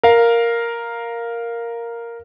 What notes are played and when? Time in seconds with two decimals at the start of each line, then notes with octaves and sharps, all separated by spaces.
0.03 A#4 F5